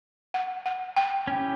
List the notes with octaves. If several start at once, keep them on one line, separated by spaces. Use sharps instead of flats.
F#5
F#5
G5
C#4 E4 G4